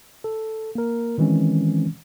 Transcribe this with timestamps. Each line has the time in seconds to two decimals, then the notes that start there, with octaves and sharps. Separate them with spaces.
0.24 A4
0.75 A#3 A#4
1.18 D#3 E3 G#3 C4 C#4